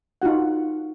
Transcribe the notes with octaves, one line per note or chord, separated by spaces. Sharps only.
D#4 F4 F#4 F#5